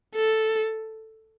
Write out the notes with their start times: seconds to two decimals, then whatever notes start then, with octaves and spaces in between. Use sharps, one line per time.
0.15 A4